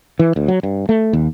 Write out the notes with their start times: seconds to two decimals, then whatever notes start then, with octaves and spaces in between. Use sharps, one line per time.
0.19 E3
0.36 D2
0.48 F#3
0.63 G2
0.89 A3
1.13 D#2